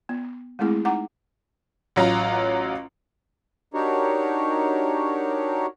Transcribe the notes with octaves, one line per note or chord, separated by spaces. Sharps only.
B3
G#3 A3 C4 E4 G#4
D#4 F#5 A#5 D6
A1 F#3 F4 A#5
D4 D#4 F#4 G4 A#4 C#5